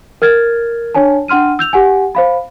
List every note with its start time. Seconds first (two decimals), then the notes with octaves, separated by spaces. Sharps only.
0.22 A#4 F6 G#6 A6
0.94 D4 C#5 G#5 A5
1.28 D4 F#5 C6 F6 D#7
1.59 E6 G6 F7
1.73 G4 F#5 G#5
2.15 C5 F5 B5